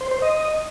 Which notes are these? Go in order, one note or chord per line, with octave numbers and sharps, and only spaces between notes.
C5
C5
D#5